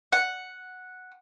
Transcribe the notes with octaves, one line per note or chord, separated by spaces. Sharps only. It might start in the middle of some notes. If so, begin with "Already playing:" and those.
F#5